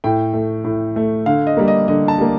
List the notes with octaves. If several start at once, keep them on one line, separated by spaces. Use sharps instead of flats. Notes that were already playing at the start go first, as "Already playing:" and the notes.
A2 G5
A3
A2
A3
D3 F5
D#5
G3 A#3
D#5
D3 D#5
A5
G3 A#3